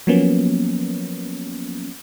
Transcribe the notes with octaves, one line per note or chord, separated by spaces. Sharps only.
F3 F#3 A#3 B3 C#4